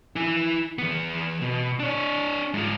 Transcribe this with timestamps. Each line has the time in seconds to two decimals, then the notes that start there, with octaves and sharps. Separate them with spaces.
0.16 E4 G#5
0.78 E3 B3
1.41 B2
1.79 D4 C#5
2.54 G#2 F4